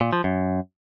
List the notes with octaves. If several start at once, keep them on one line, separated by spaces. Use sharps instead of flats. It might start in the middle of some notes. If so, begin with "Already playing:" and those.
A#2
F3
F#2